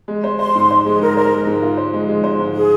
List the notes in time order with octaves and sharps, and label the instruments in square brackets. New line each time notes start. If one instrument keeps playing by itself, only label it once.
[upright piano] G#3
C5
[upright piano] C5 [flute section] C6
[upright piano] G#2
C5
[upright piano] G#3 [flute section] G#4
[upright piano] G#2 [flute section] A#4
[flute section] A#4 [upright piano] C5
[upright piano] G#3
G#2
F4
C5
G#3
G#3
C5
G#2
[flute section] G#4